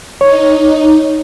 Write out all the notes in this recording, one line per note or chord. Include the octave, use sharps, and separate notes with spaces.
D#4 C#5